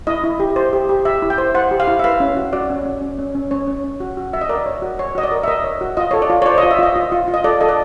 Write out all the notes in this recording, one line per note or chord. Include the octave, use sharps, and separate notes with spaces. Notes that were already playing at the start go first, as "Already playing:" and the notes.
E4 D#5
E4
G4
C5
G4
G4
G4 E5
E4
G5
C5
C5 F#5
G4
F5
E4
E5
B4 F5
C#4
F#4
F#4 D5
C#4
C#4
C#4
C#4
C#4
C#4 C#5
C#4
C#4
F#4
F#4
F#4 E5
D#5
A#4 D5
C#5
F#4
C#5
F#4 D#5
D5
A#4
E5
A#4 D#5
C#5
F#4
F4 D#5
A4 C#5
D5
F4
C#5
C5 D5
D#5
F4
E5
F4 D#5
F4
F4
F4
D#5
A4 D5
A4 D#5
D5